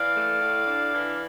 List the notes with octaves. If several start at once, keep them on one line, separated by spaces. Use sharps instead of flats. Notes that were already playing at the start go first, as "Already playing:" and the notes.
Already playing: E3 D5 F5
A3
A2
D4
E3